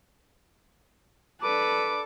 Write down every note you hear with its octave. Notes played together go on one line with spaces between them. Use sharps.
D4 A4 B4 D6